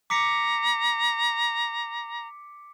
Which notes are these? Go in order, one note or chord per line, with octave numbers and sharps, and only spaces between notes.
A#5 D6 B6 C#7